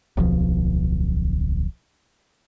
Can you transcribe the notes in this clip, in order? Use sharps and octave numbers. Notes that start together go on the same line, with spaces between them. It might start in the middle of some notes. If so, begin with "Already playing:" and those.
D1 B1 F3